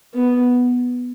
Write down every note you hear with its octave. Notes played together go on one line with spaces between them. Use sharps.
B3